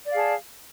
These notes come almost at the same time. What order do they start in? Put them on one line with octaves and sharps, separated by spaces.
D5 F5 G#4 A5